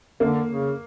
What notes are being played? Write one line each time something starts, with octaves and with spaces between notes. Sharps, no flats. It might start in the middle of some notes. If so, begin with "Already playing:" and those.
D3 A#3
C#3